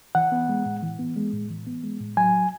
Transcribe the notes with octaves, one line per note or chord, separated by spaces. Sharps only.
E3 F#5
B3
G#3
A2
E3
B3
G#3
A2
E3
B3
G#3
A2
F#3 G#5